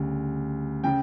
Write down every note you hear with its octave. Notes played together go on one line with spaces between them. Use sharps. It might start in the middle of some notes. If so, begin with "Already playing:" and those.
Already playing: D2 C#3 G3
C#3 G5